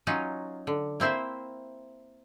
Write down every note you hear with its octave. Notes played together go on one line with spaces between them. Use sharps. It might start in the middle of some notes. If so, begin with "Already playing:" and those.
F#3 C#4 D#4 F4
D3
A#3 C4 E4 C5 E5